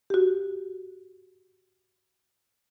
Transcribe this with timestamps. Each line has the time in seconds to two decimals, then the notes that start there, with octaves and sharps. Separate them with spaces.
0.10 F#4 G4